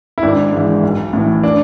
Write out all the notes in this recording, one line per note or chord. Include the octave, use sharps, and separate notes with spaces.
E4
G#1 D4
G#2 E3
B1
A2 E3
D4